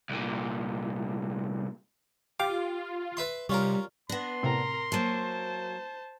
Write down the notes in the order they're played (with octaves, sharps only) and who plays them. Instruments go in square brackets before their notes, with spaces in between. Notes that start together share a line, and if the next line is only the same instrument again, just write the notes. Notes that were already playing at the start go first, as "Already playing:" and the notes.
[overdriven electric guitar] C2 A#2
[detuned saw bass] F4 [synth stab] G4 F5 [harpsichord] D6
[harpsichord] B4 E5 C6
[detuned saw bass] C3 [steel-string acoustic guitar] G3 [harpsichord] C#4 F4 A#4
[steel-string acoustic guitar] B3 D4 [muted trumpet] C6 [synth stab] A#6
[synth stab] A2 C3 C4 [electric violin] A#4 A#5
[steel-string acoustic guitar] F#3 A#3 [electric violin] C5 A5